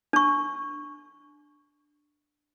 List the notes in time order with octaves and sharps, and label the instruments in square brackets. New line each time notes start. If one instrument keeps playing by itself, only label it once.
[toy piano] D4 C#6